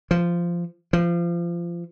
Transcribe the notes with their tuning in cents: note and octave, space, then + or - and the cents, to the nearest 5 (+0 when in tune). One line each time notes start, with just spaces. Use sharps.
F3 -15
F3 -25